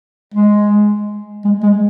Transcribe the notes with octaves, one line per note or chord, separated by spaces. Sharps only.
G#3
G#3
G#3